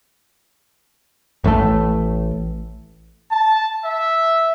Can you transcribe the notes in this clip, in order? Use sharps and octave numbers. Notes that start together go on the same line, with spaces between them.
A1 A2 C#3 A3
A5
E5